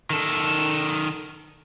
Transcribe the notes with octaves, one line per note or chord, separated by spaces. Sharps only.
D#3 A4